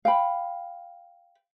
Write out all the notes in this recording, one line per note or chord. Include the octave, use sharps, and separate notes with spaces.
F5 G5 B5